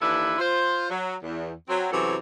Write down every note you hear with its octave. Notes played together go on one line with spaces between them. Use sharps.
D#2 E3 D4 E4 A4 B4
F4 C5
F#3
E2
F#3 C4
F#2 C3 E3 F#3 A4 C#5